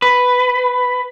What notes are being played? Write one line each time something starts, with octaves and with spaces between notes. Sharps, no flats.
B4